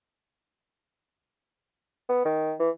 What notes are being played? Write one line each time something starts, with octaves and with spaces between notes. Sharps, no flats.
B3
D#3
E3